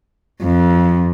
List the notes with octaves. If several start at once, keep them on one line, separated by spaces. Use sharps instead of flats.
F2